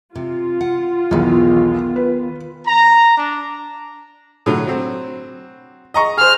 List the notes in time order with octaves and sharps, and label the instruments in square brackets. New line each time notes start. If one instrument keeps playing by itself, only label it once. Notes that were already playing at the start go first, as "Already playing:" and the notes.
[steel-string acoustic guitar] C3 [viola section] F4
[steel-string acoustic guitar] F#5
[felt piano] B1 E2 [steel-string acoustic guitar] D#3 B3
[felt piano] B4
[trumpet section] A#5
D4
[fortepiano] A2 D3 F#3
F#3 C4
D#5 A#5 C#6
[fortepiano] G#4 C5 [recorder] F6